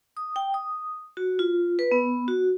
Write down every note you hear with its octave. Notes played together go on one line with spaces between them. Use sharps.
D#6
G5
D#6
F#4
F4
B4
B3
F#4